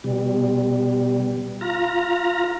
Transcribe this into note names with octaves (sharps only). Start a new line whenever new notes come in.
B2 G3
F4 A#5